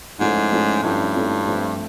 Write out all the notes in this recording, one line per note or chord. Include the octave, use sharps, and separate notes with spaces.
G#2 F3 A3 C#4 E4 A4
F3 A3 C#4 E4 A4
G2 F3 A3 C#4 E4 A4
F3 A3 C#4 E4 A4
F3 A3 C4